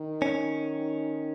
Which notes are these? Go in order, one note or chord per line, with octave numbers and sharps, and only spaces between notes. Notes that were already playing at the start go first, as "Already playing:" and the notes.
Already playing: D#3
C#4